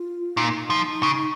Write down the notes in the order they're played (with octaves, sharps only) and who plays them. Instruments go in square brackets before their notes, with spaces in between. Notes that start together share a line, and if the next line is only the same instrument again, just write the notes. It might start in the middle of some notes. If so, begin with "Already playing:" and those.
Already playing: [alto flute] F4
[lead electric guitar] A#2 [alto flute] D#4
[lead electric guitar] F3
C#3